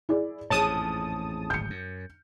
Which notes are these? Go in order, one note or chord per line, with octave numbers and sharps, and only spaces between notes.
E4 G#4 D5
A1 F2 G#2 G#4 C#5 A5 D#6
D1 G#1 G6 C#7
F#2